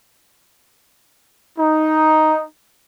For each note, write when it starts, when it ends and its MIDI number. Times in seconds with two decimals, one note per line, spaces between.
1.58 2.44 63